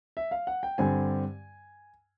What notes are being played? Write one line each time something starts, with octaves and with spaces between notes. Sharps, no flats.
E5
F5
F#5
G5
G2 D3 G3 C4 G#5